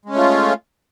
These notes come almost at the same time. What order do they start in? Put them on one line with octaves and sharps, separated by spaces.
G#3 C#4 A3 F4